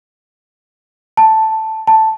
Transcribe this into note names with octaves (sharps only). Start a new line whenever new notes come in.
A5
A5